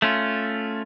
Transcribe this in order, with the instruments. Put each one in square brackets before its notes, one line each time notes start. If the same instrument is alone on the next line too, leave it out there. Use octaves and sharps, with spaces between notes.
[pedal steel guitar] A3 C#4 F4